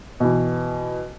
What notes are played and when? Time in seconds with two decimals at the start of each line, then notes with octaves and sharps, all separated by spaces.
0.20 B2 E3